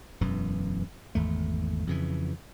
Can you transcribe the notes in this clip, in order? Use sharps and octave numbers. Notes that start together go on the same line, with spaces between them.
E1 F#2 E3
G#1 E2 A3
F2 C#3 E3